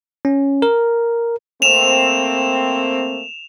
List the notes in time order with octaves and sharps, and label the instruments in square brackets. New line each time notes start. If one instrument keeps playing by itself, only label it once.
[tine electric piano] C#4
A#4
[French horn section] A3 A#3 C4 [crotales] E7 F7